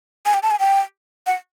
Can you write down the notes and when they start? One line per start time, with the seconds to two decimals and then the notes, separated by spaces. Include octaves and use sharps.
0.26 G#5
0.34 G5
0.43 A5
0.51 G#5
0.60 G5
1.27 F#5